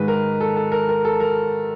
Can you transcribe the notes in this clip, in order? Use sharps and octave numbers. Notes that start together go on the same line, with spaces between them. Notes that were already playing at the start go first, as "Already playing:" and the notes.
Already playing: G#2 D#3 G#3 B4
A#4
A4
A4
A#4
A#4
A4
A#4